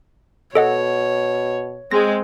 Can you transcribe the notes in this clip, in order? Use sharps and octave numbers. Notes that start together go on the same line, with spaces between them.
B2 A4 C#5 D#5 F#5
G#3 C4 A#6